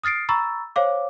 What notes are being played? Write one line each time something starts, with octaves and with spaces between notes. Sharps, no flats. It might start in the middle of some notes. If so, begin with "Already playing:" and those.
D#6 F6 A6 C7 D7
A#5 B5 C#6 E6 A6
C5 C#5 F5 D6